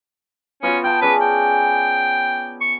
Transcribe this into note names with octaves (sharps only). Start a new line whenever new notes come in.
B3 C#4 F4 F#4
F#5 G5 A5
C#4 G#4 B4 D5
G5
C#6